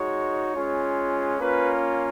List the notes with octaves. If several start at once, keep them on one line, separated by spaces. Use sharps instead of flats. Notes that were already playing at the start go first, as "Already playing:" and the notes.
Already playing: G#3 D#4 F#4 C#5
G#3 C#4 F4
A#3 C#4 F4 B4